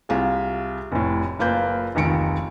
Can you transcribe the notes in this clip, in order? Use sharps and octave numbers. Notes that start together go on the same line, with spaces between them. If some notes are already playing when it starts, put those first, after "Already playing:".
C2 F4 G#4
F1 A2
F#1 A#3 F4 B4 G6
F1 C#2 D#3 C#7 D7